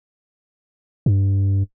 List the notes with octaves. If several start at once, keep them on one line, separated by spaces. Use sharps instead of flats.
G2